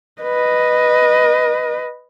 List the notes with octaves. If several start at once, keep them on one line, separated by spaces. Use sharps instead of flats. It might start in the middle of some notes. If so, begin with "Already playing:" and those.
B4 D#5